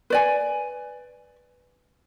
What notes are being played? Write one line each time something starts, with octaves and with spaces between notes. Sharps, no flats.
B4 D5 G#5